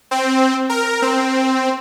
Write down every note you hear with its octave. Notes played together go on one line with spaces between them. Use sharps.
C4
A#4
C4